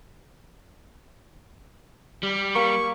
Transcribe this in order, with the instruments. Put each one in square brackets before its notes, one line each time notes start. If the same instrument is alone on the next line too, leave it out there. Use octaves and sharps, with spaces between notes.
[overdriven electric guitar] G3
[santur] A#3 [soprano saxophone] C#6